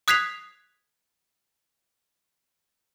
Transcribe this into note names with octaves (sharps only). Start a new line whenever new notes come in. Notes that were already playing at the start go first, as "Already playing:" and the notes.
D#6 F#6 G#6 B6 C7 F7